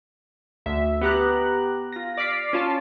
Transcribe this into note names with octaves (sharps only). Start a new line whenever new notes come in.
D2 E5
B3 G4 A#5 F#6
F4 A#6
D5 D6 F6 B6 C7
C#4 F4 A5